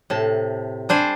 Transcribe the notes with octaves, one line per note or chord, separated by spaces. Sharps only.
A2 C3 A5
G3 D4 C5 D5 G#5